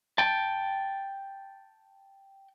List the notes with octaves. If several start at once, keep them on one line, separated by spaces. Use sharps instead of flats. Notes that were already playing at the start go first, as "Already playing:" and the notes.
G5 A5